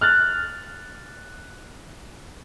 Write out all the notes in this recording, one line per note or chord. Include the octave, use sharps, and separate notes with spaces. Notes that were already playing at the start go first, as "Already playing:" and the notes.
F6 F#6 A6